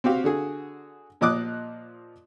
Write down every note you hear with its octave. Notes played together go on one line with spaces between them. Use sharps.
C4 F#4 G4 F5
D3 F#4 G#4
A#2 F3 D#5 D6 D#6 F#6